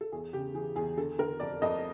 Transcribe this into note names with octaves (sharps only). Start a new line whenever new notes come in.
A4
E2 G#4
C#3 G4
E3 G#4
E2 G#4
D3 A4
D3 A#4
F2 D5
F2 D#5